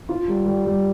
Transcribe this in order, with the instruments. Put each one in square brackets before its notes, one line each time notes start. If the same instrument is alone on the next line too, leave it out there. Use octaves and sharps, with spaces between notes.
[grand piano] F4
G3
G3
G3